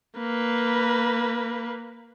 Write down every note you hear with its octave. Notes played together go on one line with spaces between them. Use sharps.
A#3 B4